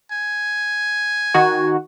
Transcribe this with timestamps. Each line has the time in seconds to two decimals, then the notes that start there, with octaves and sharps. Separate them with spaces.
0.12 G#5
1.34 D#3 F#4